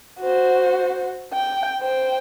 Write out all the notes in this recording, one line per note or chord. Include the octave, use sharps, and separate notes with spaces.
F#4 C5
G5
C5 G5